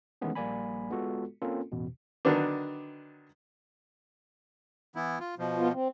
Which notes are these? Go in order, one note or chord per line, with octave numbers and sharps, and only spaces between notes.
D#3 E3 G#3 A3 B3 C#4
A#1 G3 A#3 D5 G#5 B5
G#3 B3 F4 F#4 A4
A#3 C4 C#4 F4 A4 A#4
A1 E2 B2
D3 D#3 F#3 B3 D4
E3 B3 E4
F4
B2 F3
B3 F4
C4